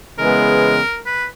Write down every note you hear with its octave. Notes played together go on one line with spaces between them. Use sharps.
C#3 E3 G#3 B3 A#4
B4